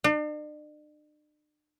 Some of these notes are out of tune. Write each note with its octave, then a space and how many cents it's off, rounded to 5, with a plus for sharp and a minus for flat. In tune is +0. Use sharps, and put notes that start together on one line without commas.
D4 +45